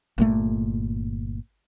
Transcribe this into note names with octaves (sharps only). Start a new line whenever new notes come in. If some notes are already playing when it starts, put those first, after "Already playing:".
G1 A#2 A3